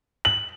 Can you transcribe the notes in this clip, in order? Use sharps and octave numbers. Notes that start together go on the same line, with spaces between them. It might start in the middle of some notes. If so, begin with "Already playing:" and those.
F#7